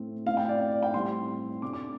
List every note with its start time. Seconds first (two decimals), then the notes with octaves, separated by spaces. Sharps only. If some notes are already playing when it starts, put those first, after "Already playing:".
Already playing: A2 A3 C4
0.26 A2 A3 C4 F5
0.37 G5
0.49 D5
0.60 D5
0.71 D5
0.83 G5
0.94 A2 G3 C4 C6
1.62 C3 A3 D4 D6
1.73 D6